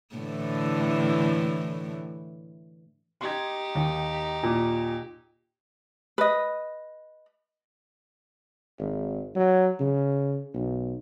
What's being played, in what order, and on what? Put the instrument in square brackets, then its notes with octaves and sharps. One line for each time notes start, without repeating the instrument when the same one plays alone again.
[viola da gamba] A2 D3 E3
[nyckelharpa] D#4 G4 [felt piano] C6 G#6
[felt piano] D#2 D#3
[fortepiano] A#2
[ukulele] B4 D#5
[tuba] G#1
F#3
C#3
B1